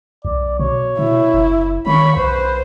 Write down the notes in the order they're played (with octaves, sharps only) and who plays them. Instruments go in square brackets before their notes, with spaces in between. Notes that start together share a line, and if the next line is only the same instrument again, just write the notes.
[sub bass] B1 [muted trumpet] D5
[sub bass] B2 [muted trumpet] C#5
[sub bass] B2 [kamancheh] E4
[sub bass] F#1
[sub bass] D#3 [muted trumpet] C#5 [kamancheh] B5 C#6
[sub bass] B1 [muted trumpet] B4 [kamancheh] C5